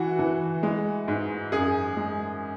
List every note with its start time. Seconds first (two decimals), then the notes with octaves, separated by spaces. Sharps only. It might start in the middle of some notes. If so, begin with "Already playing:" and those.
Already playing: E3 F#4
0.19 E3
0.63 G#3
1.08 G#2
1.52 F#2 G#4
1.97 G#3